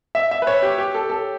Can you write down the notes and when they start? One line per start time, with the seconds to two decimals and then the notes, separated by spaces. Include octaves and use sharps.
0.15 E5
0.31 E5
0.42 B4
0.47 C#5
0.62 G4
0.78 G4
0.95 A4
1.10 A4